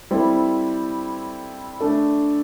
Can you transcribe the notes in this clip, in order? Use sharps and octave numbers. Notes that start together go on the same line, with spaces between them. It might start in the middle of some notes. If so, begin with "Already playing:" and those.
G3 C4 E4 A4
A3 D4 A4